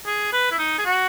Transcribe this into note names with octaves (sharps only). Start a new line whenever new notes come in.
G#4
B4
E4
D#4
G#4
F#4